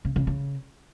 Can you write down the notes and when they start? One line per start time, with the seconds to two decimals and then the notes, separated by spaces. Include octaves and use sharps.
0.05 C#3
0.16 C#3
0.27 C#3